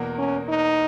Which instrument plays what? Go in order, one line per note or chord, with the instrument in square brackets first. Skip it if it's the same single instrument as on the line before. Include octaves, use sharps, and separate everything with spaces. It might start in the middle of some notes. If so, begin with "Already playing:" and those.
Already playing: [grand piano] E2 B2 A#3
[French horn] C#4
D#4